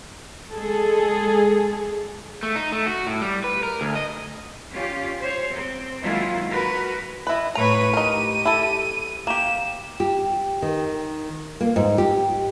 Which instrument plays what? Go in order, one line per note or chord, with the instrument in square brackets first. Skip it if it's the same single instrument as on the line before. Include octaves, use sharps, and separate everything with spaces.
[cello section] G#3 G#4 A4
[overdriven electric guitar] A3
D#4
A3
F#4
A2
G3
B4
A#4
D2
D#5
[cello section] C#4 F4 G4
C5 C#5
C4
D#3 F#3 G#3 A#3 E4 F4
F#4 A#4 B4
[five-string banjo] E4 B4 [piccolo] D#5
[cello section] A2 B4 C#5 [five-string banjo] A#5 [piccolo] D#7
[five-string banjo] D#4 A#4 [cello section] G4
[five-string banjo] E4 A4
[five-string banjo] A#3 G4 [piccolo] E7
[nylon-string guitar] G4
D#3
A#3
G#2
G4